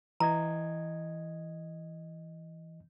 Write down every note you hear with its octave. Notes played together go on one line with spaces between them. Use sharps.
E3 D#5 A#5 G#6